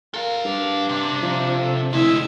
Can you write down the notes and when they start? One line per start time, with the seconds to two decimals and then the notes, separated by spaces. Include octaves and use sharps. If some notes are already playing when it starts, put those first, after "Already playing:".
0.14 A4 A#4 F5
0.45 G2 D4
0.89 C3
1.22 F3
1.61 A4
1.93 F1 D3 G#3 E4 E5